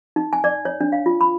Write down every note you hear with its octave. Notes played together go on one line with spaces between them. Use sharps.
D#4
G#5
D5
C#5
D4
F5
F4
B5